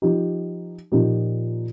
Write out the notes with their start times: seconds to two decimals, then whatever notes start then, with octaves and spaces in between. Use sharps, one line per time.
0.02 F3 D#4 G4
0.92 A#2 F3 D#4 G4